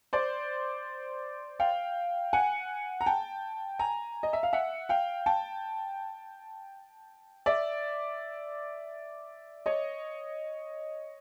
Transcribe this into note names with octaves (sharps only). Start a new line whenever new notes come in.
C5 D5
F5 G5
F#5 G#5
A#5
G5 A5
G#5 A#5
D#5
E5
F5
E5 F#5
F5 G5
G5 A5
D5 E5
C#5 D#5